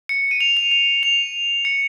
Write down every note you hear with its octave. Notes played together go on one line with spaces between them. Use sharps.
C#7
D#7
F7
F7
F7
F7
C#7